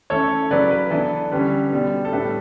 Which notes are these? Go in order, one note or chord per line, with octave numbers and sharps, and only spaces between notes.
E3 A3 C#4 A4 C#5
C#3 F#3 C#4 B4 D5
B4
E3 B3 D4 A4
D3 G3 C#4 B4
B2 G3 B3 D4
A4
A2 G3 D4 B4